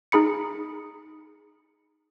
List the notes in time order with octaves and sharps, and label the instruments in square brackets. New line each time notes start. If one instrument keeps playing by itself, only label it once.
[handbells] D#4 G#4 B5 C#7